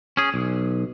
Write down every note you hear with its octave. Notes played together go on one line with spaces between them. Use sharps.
C#4 G#4
B1